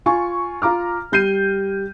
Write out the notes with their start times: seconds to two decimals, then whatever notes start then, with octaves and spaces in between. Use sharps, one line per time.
0.06 F4 G#5 C#6
0.62 F4 A#5 D6 F6
1.12 G3 G6 C7 D#7